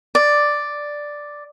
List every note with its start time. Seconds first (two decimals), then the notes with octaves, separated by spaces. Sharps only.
0.15 D5